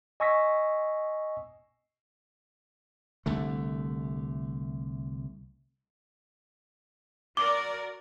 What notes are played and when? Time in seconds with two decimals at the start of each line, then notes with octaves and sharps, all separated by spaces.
0.20 D#5 G#5 C#6 E6 A#6 B6
3.26 C2 D3 A3
7.37 F#4 A#4 D5 D6